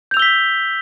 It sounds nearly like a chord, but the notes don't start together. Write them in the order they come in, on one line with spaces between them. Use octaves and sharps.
G6 F7 E6 G7 B6